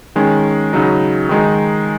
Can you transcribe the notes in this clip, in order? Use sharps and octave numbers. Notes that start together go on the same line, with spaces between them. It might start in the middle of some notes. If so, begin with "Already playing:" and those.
D#3 G#3 C#4
C#3 F#3 D#4
D#3 G#3 D#4